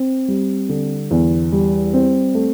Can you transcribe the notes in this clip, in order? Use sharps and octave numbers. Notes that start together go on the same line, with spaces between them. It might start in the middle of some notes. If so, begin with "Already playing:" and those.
Already playing: C4
G3
D3
E2
G3
C4
A3